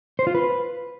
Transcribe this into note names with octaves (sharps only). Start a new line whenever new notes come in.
C5
F4
B4